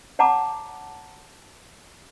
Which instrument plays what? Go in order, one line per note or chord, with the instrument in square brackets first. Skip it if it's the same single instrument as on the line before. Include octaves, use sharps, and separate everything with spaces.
[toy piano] C#5 F#5 A5 A#5 D6